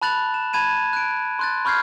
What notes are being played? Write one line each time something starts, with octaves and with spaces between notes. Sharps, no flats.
A5 B5 F#6 A6 F7 F#7
E7
A5 B5 G#6 D#7 E7
F#6 D7
C6 F#6 A6
B5 C#6 F6 G6 G#6 C7